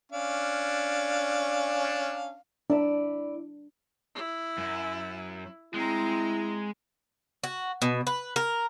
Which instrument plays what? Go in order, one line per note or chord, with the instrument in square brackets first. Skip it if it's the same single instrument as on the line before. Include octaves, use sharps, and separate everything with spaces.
[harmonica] C#4 D4 F5
[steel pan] D4 [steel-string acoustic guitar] E4 D5
[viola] E4
[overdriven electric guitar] F#2
[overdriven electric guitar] G#3 [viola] C4 A#5 [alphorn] E4
[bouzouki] F#4
B2
B4
A#4